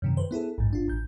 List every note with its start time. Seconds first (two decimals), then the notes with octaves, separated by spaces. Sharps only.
0.02 F#2 C3 D#3
0.17 B4 C5
0.31 B3 E4 G#4 A4
0.58 A1 G#2
0.71 G1 D4 F4
0.88 A1 G6